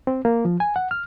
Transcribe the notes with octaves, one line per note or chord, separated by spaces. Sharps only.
C4
A#3
F3
G#5
F#5
F6